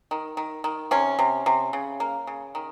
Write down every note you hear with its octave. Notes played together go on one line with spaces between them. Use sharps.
D#3
D#3
D#3
C3 C#4
C3
C3
C#3
A#3
C#3
D#3